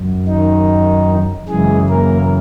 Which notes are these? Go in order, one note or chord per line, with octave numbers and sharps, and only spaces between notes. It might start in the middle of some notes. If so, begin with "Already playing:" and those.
Already playing: F#2
D#3 D#4
F#2 C#3 E3 G#3 G#4
A#3 A#4